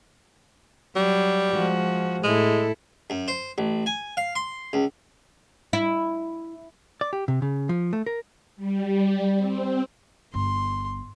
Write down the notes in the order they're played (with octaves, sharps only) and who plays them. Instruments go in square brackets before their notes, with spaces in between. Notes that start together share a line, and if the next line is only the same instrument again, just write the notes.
[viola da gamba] F#3 [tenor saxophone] G3
[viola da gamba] F3 G#3 F#4
[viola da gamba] A2 E4 A4 [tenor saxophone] G#3
[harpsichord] F#2
C5
A1
G#5
F5
C6
C#2
[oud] E4
[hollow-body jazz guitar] D5
G4
C3
C#3
F3
A3
A#4
[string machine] G3
C4
[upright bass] G1 [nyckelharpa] C6